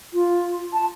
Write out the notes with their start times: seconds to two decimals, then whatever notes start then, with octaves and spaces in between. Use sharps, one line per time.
0.13 F4
0.73 A5